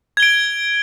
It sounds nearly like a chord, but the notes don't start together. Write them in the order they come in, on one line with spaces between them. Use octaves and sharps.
G#6 G7 D7